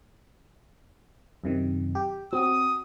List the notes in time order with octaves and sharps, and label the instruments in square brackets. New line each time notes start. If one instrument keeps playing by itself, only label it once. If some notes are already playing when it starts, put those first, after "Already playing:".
[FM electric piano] F#2 C3 D#3
G4
[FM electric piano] C4 [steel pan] F#4 [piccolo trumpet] D#6